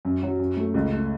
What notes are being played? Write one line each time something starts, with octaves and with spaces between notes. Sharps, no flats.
F#2
F#3
F#2
A3
C#2
A3